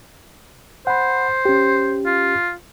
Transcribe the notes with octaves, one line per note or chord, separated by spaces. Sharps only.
C5 F#5 B5
C#4 G4
F4